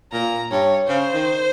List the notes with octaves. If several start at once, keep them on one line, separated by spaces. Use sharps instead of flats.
A#2 A#5
G2 C#5
C#3 C5
D#3